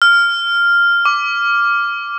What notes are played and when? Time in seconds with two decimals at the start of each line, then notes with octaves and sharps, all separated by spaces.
0.02 F6
1.05 D6